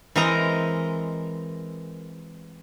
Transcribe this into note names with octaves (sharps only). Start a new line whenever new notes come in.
E3 G#3 C4 A#4 D#5 A#5